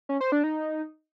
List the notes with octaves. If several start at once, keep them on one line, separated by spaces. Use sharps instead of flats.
C#4
C5
D4
D#4